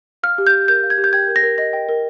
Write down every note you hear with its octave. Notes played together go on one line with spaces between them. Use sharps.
F5 F6
G4
G6
G4
A#4 G6
F5
G#6
G4
G6
G5 G#6
A#4
A#6
A#4
D#5 A#6
G5
A#4